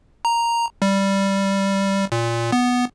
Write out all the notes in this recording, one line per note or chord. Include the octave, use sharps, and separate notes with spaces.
A#5
G3
A#2
B3